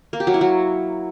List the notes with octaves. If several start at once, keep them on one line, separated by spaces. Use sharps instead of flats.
A#3
G4
F#3
E4
F#3